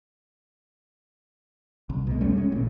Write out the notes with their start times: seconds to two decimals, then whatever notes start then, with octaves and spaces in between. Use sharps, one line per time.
1.90 C2
2.07 B2 G#3
2.21 E2 G3 A3 C#4
2.37 G#3 C#4
2.52 A1 A#2 C#3